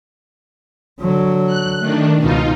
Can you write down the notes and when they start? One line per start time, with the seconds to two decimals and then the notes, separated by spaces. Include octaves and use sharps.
1.00 D3 F#3
1.47 F#6
1.80 D#3 A3 D4
2.20 C#2 B2 D#4 F4